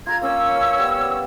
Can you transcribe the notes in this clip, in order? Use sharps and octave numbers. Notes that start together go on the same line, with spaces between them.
F4 A4 A#5 G#6
A#3 C#4 E6
B4 C#5 E5
G3 B3
D5